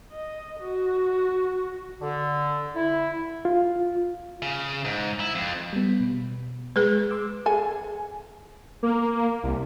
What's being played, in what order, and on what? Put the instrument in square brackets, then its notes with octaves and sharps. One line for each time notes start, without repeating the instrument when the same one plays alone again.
[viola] D#5
F#4
[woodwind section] D3
E4
[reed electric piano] F4
[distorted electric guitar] C#3
G#2
E4
F2
[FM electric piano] G3 B3
B2
[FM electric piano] G#3 [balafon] G#4 B4
[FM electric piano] C6 D6 E6
[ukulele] G#4 [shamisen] A4 G#5
[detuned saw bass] A#3
C2